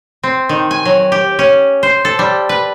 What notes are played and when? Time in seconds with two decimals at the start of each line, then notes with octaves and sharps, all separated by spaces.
0.23 C4
0.49 D#3
0.71 G#5
0.85 F#3
1.12 G4
1.39 C#4
1.83 C5
2.05 A4
2.19 G3
2.49 B4